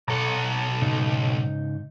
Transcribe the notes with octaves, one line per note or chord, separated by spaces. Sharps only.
B1 A4 F#5 A5 A#5
G#2 C#3 D#4